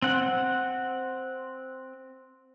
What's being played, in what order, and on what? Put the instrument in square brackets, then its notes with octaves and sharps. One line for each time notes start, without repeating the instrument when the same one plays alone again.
[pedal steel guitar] C4 F#5